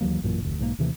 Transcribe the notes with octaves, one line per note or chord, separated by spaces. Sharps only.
D#2 E3 F#3 A#3
A1 F#2 A#2 E3
F1 D2
B1 G#2 E3 A#3
D#2 C3 E3 A3